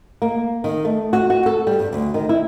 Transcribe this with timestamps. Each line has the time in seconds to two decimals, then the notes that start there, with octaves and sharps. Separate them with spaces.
0.22 A#3
0.64 D#3
0.85 A3
1.13 F#4
1.30 F#4
1.46 A4
1.67 G3
1.79 G2
1.93 D2
2.14 D#3
2.29 E4